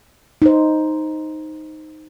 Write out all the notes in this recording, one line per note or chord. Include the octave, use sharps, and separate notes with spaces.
D#4 C5